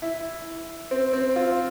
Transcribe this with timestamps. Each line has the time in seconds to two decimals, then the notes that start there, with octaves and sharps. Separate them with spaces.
0.02 E4
0.91 C4
1.13 C4
1.36 F4